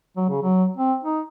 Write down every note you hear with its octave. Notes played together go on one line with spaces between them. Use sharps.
F#3
C#3
F#3
C4
D#4